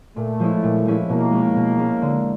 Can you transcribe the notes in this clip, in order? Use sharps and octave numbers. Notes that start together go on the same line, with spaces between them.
A#2 A3
F3 G#3 C#4 E4
A#2
F3 G#3 C#4 E4
B2 A#3
G#3 C#4
B2
G#3 C#4
D3